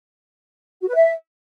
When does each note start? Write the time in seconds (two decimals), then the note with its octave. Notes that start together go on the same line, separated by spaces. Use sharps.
0.81 F#4
0.88 B4
0.95 E5